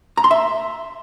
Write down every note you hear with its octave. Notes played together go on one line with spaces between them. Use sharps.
A#5
C6
E5